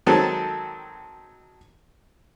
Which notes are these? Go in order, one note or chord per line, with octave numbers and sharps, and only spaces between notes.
D#3 F#3 G#3 C4 A4